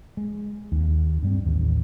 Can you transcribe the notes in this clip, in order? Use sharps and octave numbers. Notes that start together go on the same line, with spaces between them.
G#3
D#2
G2 G3 C4
A1 D#2